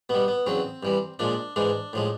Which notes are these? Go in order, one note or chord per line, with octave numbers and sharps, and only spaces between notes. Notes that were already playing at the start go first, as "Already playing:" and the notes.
B2 G3 B3
B3
E2 C#3 F#3 C4
G2 E3 G3
A#2 F3 G#3 D4
G#2 E3 G#3 D4
A2 F3 G#3